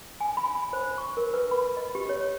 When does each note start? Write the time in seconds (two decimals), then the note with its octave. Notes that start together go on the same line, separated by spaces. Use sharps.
0.20 G#5
0.37 B5
0.55 B5
0.73 C5
0.98 C#6
1.17 A#4
1.34 B4
1.51 B5
1.77 D#5
1.95 G4
2.09 C#5